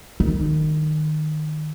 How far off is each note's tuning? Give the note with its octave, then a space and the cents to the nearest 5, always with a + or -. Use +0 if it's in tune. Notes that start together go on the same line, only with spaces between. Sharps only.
D#3 -20